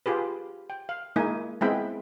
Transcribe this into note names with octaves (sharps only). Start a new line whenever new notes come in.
F4 G4 G#4 B4
G5
F5
G#3 A#3 D#4 E4 G#5
G#3 B3 C4 E4 G5 B5